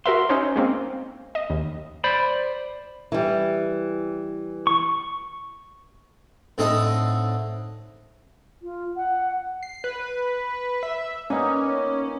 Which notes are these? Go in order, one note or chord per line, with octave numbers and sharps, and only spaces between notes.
F#4 A#4 E5 C6
C#4 D#4 C5
G#3 A#3 C4
D#5
D#2
C5 D5 B5
E3 G3
C#6
A2 D3 C4 D#4 A4 D#5
F4
F#5
C7
B4
E5
A#3 B3 C#4 D#4